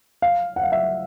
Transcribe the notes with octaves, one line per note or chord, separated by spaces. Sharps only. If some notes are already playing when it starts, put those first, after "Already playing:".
F5
F#5
F5
E5